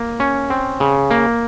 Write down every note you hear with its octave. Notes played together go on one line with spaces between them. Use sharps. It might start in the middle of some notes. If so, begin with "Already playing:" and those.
Already playing: A#3
C#4
C4
C#3
A#3